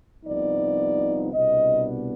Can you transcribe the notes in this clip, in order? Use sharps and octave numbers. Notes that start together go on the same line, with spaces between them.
C2 C3 F3 B3 D#4 D5
C2 B2 B3 D4 D#5